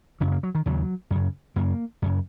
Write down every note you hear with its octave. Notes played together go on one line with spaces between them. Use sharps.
F#2 C#3 C#4
G#3
A#3
F#3
D#3
D#2 C#3 F#3
F#2 C#3
F#2 C#3 A#3
F#2 C#3